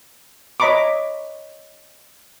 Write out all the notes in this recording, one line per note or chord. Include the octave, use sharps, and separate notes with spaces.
C#5 D#5 A#5 B5 C#6 D6